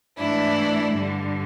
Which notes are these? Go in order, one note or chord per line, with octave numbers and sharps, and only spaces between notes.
G#2 E3 A3 D4 E4
G2 D3 G3